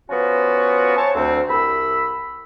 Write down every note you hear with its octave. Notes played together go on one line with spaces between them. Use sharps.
F3 B3 C#4 F4 F#4
C5 C#5 G#5 A5 C#6
D2 C4
C2 B5 E6